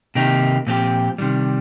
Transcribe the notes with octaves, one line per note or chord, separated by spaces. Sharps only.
C3 D#3 A#3 D#4 G4
A#2 F3 C4 G4
C3 D#3 G3